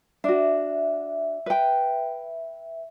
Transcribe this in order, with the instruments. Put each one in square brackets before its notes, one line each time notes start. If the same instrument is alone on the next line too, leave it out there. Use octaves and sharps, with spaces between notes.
[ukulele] D4 F#4 [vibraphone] E5
[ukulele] B4 G5